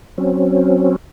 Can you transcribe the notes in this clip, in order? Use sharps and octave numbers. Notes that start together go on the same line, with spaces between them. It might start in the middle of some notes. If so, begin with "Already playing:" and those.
F#3 C4 C#4